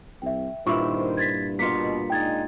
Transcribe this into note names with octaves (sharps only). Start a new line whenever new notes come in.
C2 E5 G5
G2 A#2 D#3 E4 C5 C#6
G#6 A6 B6
B2 A#3 F4 B6 C#7
G#3 D4 D#4 G5 G#6 A6